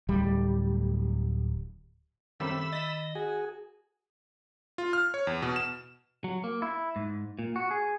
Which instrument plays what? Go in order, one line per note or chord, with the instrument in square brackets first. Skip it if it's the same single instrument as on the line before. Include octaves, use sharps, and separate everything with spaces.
[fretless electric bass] D1 G3
[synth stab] F#2 C3 G3 [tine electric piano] D#3 [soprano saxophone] A3 [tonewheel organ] B5 E6
[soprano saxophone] D#5 [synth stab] A6 B6
[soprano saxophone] F#4 [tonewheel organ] G#4
[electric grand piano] F4
F6
C#5
E2
B2
E7
[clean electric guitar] F#3
A#3
E4
G#2
A#2
F#4
G#4